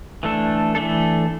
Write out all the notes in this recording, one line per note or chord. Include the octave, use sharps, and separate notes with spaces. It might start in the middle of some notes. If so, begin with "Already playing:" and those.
E3 A3 D4 A4
E3 A3 D4 A4